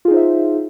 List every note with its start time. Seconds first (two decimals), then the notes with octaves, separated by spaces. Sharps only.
0.05 F4
0.08 G#4
0.11 D#4
0.14 C5
0.17 E5